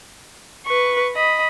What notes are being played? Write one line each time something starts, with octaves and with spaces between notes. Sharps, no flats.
B4 C#6
D#5 B5